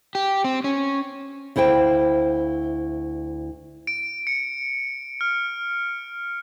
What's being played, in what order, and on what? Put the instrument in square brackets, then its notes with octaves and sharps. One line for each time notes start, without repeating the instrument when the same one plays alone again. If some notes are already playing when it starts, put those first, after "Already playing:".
[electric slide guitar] G4
C4
C#4
[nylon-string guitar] D2 E4 C5 F5 G5
[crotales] D7
C#7
F6